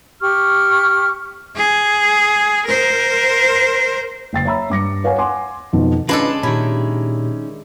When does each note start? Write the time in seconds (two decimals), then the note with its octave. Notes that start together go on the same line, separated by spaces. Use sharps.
0.22 G4 C#6 F6
1.56 G#4
2.66 A#4 C5
4.33 F#1 G5 A6 C7
4.45 C#5 E5 A#5 B5 E6
4.70 G2 D6 A#6 C#7
5.04 B4 C#5 F5 F#5 G#5
5.18 F#5 G#5 C6 D6
5.73 F2 B2 D#3 F3
6.09 D#3 G#3 C#4 D4 F4 A4 B4 D#5
6.43 A#2 D#3 C#4 E4 G4